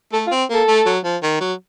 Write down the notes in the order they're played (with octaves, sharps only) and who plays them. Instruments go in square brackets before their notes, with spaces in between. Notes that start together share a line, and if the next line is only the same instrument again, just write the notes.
[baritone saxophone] A3 [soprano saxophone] A4
[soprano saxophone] F4
[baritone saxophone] C4
[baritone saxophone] A#3 [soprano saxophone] A4
[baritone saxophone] A3
F#3
F3
D#3
F#3